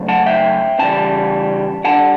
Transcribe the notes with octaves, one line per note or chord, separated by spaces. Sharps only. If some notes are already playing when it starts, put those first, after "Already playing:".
Already playing: C#3 F#3 A3
F#5 A5
E5 G5
C#3 E3 G3 A5
D3 G3 D4 F#5 A5